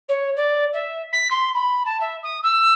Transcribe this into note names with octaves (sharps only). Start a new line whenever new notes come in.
C#5
D5
E5
B6
C6
B5
A5
E5
D#6
E6